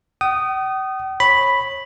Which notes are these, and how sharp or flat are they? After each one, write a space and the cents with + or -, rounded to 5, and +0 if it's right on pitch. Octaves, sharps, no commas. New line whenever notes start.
G5 -45 D#6 -10
C#5 -25 B5 +0